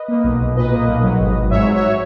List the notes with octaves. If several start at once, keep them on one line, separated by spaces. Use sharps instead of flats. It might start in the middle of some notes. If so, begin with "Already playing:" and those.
Already playing: B4 D#5
A#3
B1
B1
A#2 B4 D#5
A#3
B1
F#3
G#1
G#1
G#2 C#5 E5
F#3
C#5 E5